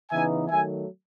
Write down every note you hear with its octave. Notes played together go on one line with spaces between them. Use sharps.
C#3 E3 B3 D#4 E5 G#5
D#3 F#3 A3 E5 G#5